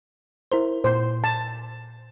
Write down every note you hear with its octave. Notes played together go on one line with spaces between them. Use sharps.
E4 A#4 C5
A#2 C5
A5